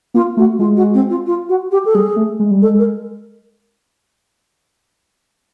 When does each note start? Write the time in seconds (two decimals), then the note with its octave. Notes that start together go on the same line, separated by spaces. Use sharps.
0.14 A#3 F4
0.37 A3 F#4
0.59 G#3 F4
0.77 F#4
0.94 C4
1.10 F4
1.27 F4
1.49 F#4
1.72 G4
1.85 A4
1.95 G3 G#4
2.16 A3
2.39 G#3
2.51 G3
2.62 G#3 A4
2.79 A#4